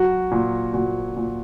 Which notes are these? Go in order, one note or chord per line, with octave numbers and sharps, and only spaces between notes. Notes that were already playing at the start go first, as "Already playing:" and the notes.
Already playing: F#3 F#4
A#2
A#2 F#4
A#2